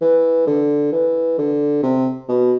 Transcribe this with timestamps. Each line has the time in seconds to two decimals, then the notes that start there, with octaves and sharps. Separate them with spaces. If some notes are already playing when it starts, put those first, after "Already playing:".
0.02 E3
0.47 D3
0.93 E3
1.38 D3
1.83 C3
2.29 B2